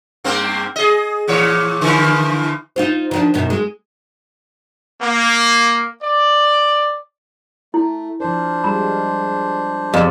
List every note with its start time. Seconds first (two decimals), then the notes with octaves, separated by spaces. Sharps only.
0.24 G2 A#3 C4
0.76 G#4 D#5
1.28 A#2 E3 C#5
1.81 D3 E3 F3
2.76 D#4 F4 C5
3.11 D#3 F3 D4
3.34 F#2 B2 D#3
3.50 G#3
5.01 A#3
6.01 D5
7.74 A3 E4
8.20 F3 D4 A#4 C5
8.64 G3 G#3 F4 B5
9.94 F2 G4 G#4 D5